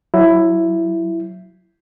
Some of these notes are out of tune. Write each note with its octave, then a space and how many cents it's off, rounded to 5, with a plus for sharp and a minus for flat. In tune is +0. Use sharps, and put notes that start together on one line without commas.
F#3 +0 E4 +10